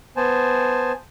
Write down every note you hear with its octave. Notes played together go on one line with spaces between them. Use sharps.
B3 C5 G#5 A5